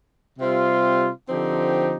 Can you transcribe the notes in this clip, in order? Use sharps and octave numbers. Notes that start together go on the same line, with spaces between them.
C3 G3 C4 F4
D3 F3 C4 D#4 G4